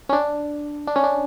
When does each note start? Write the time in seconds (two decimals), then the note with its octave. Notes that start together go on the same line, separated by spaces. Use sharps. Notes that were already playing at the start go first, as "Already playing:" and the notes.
0.09 C#4
0.13 D4
0.87 D4
0.96 C#4
1.04 D4